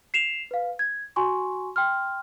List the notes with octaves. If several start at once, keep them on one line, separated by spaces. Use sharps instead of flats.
C7 E7 F7
B4 F5
G#6
F#4 G#5 C6 C#6
G5 C6 F6